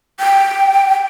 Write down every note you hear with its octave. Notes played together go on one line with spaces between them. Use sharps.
G5